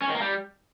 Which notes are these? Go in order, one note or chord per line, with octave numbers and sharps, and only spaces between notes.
C#4
D#3
A#3
G3